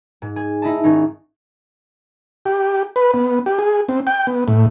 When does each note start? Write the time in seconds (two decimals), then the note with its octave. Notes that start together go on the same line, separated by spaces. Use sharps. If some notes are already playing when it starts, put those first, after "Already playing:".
0.22 G#2
0.36 G#4
0.62 D#4 E4 D#5 A5
0.84 G#1 C#4 D#4
2.46 G4
2.96 B4
3.14 B3
3.46 G4
3.59 G#4
3.89 C4
4.07 G5
4.27 B3
4.48 A2